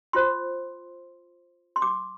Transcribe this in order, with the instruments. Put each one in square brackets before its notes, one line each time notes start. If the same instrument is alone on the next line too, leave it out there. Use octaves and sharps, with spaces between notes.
[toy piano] F4 C5 C6
C6
D6